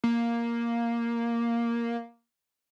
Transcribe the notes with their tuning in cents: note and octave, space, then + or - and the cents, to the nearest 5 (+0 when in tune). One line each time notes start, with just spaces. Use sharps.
A#3 +5